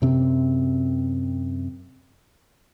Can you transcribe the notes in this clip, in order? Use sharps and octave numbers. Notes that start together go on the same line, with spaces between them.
F#2 C3 C4